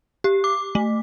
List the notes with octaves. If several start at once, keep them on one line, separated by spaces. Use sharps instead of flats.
G4
D6
A3